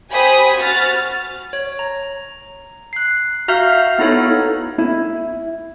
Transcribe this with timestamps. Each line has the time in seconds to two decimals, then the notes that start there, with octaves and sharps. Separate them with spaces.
0.11 G4 C5 G#5 B5 D#6
0.55 F#4 F6 A6
1.53 C#5
1.79 A#5
2.93 F#6 C7
3.48 F#4 E5 F5 A#5 F6 G6
3.98 B3 D#4 E4 A4 C#5
4.78 E4